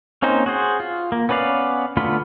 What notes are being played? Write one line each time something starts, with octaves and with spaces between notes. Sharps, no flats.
A#3 C4 C#4 D#4 C5
F#4 G#4 C5
F4
A#3
B3 C#4 B4 D5 F5
D3 A3 B3 F4 B5